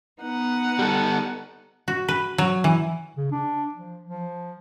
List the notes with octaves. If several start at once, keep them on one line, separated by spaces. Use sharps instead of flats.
B3 D#4 F#5
G3 A4
F#4
B4
F#3
E3
C#3
D4
F3
F3